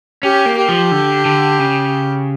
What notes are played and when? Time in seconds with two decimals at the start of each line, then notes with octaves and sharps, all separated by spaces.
0.23 C#4 G4
0.46 A#3
0.57 G4
0.69 F3
0.92 D3
1.25 D3
1.59 C#3